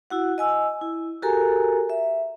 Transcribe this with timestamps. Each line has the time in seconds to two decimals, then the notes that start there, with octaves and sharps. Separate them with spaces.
0.10 E4 F#4 F#5
0.38 D#5 G#5 E6
0.81 E4
1.22 F#4 G4 A4 A#4 G#5 A#5
1.90 E5